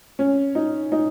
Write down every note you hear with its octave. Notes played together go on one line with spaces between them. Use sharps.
C#4
D#4
D#4